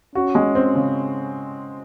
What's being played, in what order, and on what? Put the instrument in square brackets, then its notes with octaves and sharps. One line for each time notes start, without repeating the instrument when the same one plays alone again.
[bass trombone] C#4 [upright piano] F#4
[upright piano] G#3
C4
C#3